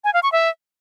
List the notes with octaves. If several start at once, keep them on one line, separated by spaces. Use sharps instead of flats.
G#5
F5
C#6
E5